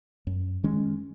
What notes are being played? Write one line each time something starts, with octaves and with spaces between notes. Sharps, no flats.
F#2
D#3 G#3 C#4